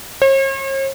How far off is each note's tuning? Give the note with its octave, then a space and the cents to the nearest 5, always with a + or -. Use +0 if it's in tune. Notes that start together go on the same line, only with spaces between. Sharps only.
C#5 -45